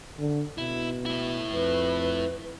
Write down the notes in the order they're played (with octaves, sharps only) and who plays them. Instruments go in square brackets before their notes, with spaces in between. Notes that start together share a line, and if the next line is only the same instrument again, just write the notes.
[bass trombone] D3
[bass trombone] B2 [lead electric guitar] E4
[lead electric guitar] A2 E4
[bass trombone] F2 [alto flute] B4